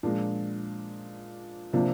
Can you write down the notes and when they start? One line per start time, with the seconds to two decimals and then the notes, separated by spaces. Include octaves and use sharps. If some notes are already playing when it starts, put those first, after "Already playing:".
0.03 A#2 F3 G#3 D4
1.73 C3 F3 A#3 D4